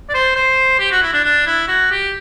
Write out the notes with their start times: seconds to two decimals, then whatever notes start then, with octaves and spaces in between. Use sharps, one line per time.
0.09 D5
0.14 C5
0.36 C5
0.80 G4
0.92 F#4
1.02 E4
1.13 D4
1.24 D4
1.46 E4
1.68 F#4
1.91 G4